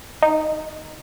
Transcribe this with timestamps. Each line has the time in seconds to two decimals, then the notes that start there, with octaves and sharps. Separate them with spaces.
0.22 D#4